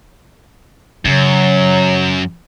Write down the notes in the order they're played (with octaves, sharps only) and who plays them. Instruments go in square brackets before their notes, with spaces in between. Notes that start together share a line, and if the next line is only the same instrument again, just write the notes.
[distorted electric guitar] F#2 [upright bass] C#3 [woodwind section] F#3